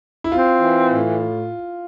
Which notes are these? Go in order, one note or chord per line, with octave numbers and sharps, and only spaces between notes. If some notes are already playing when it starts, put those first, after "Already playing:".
E4
C4 F4
E3
A2